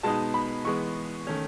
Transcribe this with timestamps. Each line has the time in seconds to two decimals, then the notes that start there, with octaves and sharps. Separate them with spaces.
0.03 B2 G#3 B3 D#4 A5
0.34 B5
0.65 E3 G#3 B3 C#6
1.27 D#3 A3 C#4